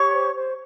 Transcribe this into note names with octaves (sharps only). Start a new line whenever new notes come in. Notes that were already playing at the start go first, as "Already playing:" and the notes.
Already playing: G4 C#5 C#6
C5
C5